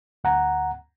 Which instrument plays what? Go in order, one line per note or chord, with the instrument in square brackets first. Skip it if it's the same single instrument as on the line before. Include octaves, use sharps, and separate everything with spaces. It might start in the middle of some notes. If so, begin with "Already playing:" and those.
[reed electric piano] D2 F#5 A#5